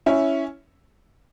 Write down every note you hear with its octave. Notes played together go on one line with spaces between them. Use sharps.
C#4 E4